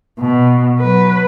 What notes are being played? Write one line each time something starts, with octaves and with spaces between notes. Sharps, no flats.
B2
F#3 B4